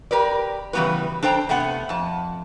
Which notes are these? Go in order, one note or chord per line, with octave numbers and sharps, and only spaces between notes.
G4 A#4 B4 D5
C#3 E3 G3 B3 F#4 B4
D4 A4 C5 G5 A#5
C3 A3 B3 F#5
F2 A5